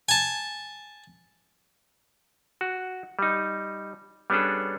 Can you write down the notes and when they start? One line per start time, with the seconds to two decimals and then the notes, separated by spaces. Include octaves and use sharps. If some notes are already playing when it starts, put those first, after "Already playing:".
0.09 G#5 A5
2.61 F#4
3.19 G3 D#4
4.30 G3 B3 C#4 D4 G#4 A4